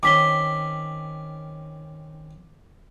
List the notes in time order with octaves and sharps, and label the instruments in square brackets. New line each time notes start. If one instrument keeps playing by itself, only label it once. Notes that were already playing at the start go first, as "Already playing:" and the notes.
[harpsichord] D#3 C4 C#4 [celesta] D6 B6 G7